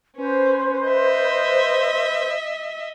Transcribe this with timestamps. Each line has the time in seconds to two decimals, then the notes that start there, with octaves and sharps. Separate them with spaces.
0.17 C#4 B4 C5
0.87 D#5 E5